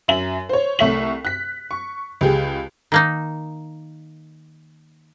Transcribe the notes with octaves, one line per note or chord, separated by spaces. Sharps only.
F#2 E5 F#7
C5 C#5
C2 A3 E5 C#6 B6 F#7
F#6 B6
C#6
C#2 G4 G#4
D#3 A#3 D#4